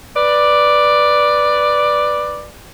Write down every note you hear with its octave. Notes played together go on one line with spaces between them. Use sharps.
B4 D5